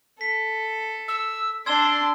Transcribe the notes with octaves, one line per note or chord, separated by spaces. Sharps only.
A4 B6
E6
D4 D5 A5 C6 E6 G#6